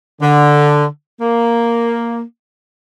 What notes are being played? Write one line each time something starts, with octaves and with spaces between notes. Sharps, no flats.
D3
A#3